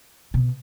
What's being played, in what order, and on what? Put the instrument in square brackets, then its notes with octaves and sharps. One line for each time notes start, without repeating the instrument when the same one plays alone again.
[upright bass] B2